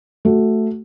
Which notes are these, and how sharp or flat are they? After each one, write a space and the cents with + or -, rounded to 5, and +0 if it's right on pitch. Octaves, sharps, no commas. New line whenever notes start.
A3 +0 F#4 +5